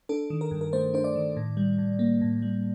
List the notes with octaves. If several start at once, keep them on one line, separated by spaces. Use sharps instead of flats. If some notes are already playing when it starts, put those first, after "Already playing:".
D4 A4
D#3
A#4
G2
A#4
A3 C5
D4 C5
D5
D#3
A2
G3
A2
A#3
A2
G3